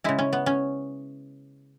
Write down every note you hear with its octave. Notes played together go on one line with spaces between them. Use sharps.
C#3 G#3 E4
C#4
B3
C#4